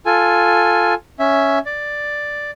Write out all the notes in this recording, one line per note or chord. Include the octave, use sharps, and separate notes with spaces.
F4 A4 G#5
C#4 E5
D5